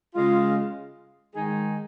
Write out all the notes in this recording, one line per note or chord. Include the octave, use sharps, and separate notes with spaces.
C#3 G#3 F4
D#3 G#3 D#4 G#4